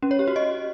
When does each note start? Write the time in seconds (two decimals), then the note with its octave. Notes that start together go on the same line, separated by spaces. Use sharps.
0.03 C#4
0.11 C#5
0.19 G4
0.28 F#4
0.36 D#5